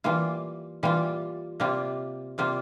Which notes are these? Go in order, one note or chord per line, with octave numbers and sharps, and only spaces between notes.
E3 G3 A#3 F4
E3 G3 A#3 F4
C3 G3 A#3 F4
C3 G3 A#3 F4